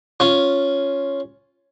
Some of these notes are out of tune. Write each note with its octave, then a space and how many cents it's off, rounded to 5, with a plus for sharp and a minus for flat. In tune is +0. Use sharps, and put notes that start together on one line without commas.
C#4 +0 F4 +0